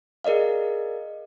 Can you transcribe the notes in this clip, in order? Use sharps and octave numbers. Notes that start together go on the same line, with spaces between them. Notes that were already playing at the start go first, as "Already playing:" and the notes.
G#4 A#4 D5 D#5 F5